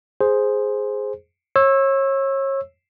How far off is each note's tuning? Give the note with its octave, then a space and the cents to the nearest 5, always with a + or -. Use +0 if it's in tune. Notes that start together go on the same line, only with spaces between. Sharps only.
G#4 +0 C5 +0
C#5 -30 E6 +0